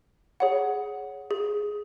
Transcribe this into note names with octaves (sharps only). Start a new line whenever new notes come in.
G#4 C#5 F#5
G#4